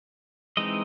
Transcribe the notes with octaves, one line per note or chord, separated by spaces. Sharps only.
E3 G#3 C4 D#4 D#5